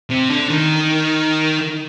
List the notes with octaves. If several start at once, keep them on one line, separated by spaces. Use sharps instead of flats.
C3
D3
D#3